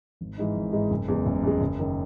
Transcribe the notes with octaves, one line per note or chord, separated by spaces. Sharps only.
G#1
G#2 E3 G#3 D#4
G#1
G#2 E3 G#3 D#4
F#1
E2 C#3 G#3
F#1
E2 C#3 G#3
F#1
F#2 D#3